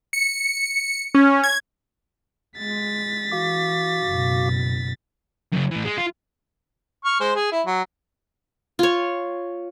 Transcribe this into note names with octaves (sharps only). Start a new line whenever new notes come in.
C#7
C#4
G#6
G#3 A6 B6
E3 F#4 F5 D6
F#1 B2
F#2 C#3
A2 E3
G#3
F4
C#6 F6
G#3 C5
G#4
E4
F#3
F4 C#5